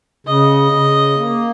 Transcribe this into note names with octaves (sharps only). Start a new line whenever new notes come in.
C#3 D#5
C#3
A#3